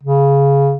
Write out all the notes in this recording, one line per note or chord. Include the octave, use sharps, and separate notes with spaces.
C#3